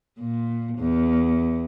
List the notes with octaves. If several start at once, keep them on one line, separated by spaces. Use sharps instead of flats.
A#2
E2